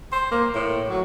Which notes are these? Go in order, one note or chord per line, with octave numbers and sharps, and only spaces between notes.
C5
A#3
A2
F#3